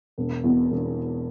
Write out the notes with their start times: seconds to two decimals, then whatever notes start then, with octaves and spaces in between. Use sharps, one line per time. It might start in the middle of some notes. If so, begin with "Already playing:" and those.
0.18 E1
0.44 E2 B2
0.71 E1